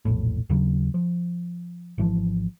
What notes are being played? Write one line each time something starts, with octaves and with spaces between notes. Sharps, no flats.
E1 A#1 A2
D#2 C#3 F#3
F3
G#1 E3 F3